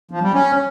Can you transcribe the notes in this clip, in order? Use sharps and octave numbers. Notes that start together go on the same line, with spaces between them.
F3
G3
C#4